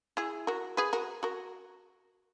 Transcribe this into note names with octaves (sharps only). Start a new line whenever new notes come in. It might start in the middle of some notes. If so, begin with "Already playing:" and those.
E4 G#4
F#4 A#4
G#4 B4
F#4 A#4
F#4 A#4